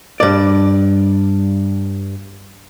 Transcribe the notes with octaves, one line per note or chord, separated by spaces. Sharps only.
G2 D5